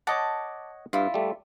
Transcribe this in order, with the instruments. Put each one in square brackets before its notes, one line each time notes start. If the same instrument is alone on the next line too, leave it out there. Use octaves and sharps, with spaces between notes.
[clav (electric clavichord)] C#5 D#5 F#5 [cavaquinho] A5 D6
[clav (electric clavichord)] G2 [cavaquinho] E4 F4
[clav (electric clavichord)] G3 A3